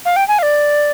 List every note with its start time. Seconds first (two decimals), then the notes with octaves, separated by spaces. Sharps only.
0.05 F5
0.16 G5
0.28 G#5
0.39 F5
0.43 D5